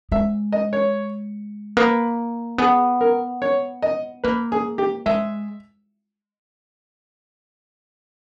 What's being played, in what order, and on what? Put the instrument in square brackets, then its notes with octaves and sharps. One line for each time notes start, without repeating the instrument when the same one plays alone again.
[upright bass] G#3 [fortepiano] E5
[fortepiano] D#5
C#5
[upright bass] A#3 [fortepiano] B4
[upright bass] B3 [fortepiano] G#4
[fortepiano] A#4
C#5
D#5
[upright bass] A#3 [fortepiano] B4
[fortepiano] G#4
G4
[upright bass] G#3 [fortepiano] E5